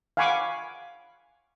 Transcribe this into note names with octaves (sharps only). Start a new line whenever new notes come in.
F5 F#5 G#5 B5 C#6 D6